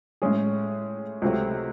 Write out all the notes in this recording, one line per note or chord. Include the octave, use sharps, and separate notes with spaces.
A2 G#3 C#4 G#4
C#2 C3 F#3 A3